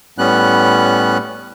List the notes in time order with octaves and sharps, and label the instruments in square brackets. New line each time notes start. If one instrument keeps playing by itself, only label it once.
[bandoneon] A2 G3 B3 C#4 F#6